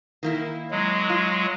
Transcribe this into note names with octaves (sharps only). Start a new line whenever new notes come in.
D#3 A#3 E4
F#3 G#3
F4